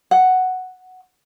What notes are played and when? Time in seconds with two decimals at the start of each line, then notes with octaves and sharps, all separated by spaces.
0.11 F#5